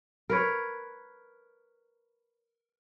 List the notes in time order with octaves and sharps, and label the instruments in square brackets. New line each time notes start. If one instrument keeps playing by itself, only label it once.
[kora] A#4 B4 C#5